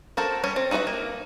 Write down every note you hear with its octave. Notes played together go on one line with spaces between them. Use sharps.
F#4 A4 A#4 C5
G3 C#4 C#5
C4
D#4 F#4 B4 D5 E5
A#3